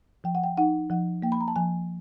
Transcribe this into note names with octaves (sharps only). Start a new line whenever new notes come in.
F3 G5
F#5
G5
D#4 F#5
F3 F#5
A#3 G5
B5
A#5
A5
F3 G#5